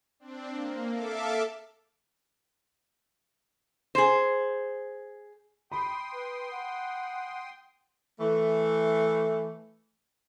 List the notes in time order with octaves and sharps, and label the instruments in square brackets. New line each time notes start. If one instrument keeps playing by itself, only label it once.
[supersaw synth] C4 D4
A#3
A4 E5 F5 A5 D6
[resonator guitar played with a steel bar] G#4 C5
[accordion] G5 C6 D#6 [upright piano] B5
[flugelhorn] B4
F#5
[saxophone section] E3 A3